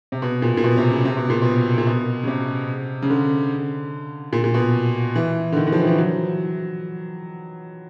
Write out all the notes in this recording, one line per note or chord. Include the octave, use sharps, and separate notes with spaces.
C3
B2
A#2
A#2
B2
C3
C#3
C3
B2
A#2
B2
A#2
B2
C#3
C3
C#3
D3
A#2
A#2
B2
E3
D3
D#3
D#3
F3
E3
F3
E3
F#3